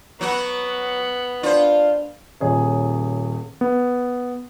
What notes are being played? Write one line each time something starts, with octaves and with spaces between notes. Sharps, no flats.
F#3 B3 F#4
D4 F4 C5
D#1 G#4 C#5
B3